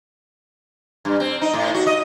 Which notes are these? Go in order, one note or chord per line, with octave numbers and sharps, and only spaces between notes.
G2
C4
D#4
A2
F#4
D#5